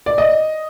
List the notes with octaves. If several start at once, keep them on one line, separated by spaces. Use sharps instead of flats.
D5
D#5